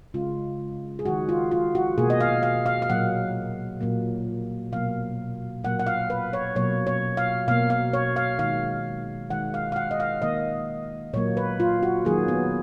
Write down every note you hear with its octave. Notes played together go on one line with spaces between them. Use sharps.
C#3 G#3 F4
G#4
D#3 G#3 F#4
F4
F4
F#4
B2 A#3 G#4
D#5
F5
F5
F5
F5
A#2 F#3 A#3 F#5
A#2 F#3 A#3
B2 F#3 A#3 F5
A#2 F#3 A#3 F#5
F#5
F5
B4
C#5
B2 F#3 A#3 C#5
C#5
F5
B2 A#3 F5
F5
C#5
F5
D#3 G#3 F5
D#3 G#3 F#5
F5
F5
F#5
D#5
F5
D#3 A#3 D#5
A#2 F#3 A#3 C#5
B4
F4
F#4
D#3 F#3 A#3 G#4
B3